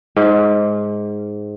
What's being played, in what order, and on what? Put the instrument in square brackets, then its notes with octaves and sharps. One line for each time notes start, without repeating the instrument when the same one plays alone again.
[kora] G#2